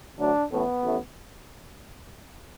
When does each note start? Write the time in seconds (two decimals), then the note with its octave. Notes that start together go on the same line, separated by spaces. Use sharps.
0.18 D2 D3 F#3 A3 D4
0.51 A1 A2 E3 A3 B3
0.84 A1 A2 A3